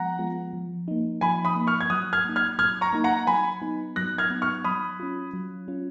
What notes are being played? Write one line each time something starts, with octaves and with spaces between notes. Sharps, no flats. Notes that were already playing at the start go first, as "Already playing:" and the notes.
Already playing: F3 G#3 B3 F#5 A#5
G#3 B3 F4
F3
A#3 D#4
F3 G#5 B5
B5 D#6
A#3 D#4
C#6 F6
G#6
F#3 D#6 F#6
F6 G#6
A#3 D#4
F6 G#6
F#3 F6 G#6
A#5 C#6
A#3 D#4
F#5 A#5
F#3 G#5 B5
B3 D#4
F#3 F#6 A#6
F6 G#6
B3 D#4
C#6 F6
F#3 B5 D#6
C#4 F4
F#3
C#4 F4